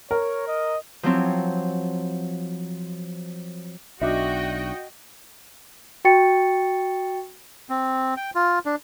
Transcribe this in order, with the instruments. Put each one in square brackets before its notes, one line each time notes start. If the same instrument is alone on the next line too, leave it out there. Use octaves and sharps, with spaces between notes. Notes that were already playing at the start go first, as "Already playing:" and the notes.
[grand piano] A#4 [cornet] C#5
[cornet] D#5
[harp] F3 F#3 C4 E4
[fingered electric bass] B1 [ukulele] D4 D#4 E5 [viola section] F#4 D#5 G5
[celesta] F#4 G5 C#6 A6 C#7
[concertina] C4
G5
F4
D4